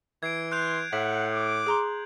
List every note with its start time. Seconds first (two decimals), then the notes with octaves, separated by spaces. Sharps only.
0.23 E3 G#6 C7 D7
0.52 C6 F#6 G6 F7
0.93 A2 E5 F#5 F#7
1.34 D6
1.66 G#4 A#5 C6